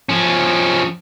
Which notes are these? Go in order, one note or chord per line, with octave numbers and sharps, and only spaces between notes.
F3 C#4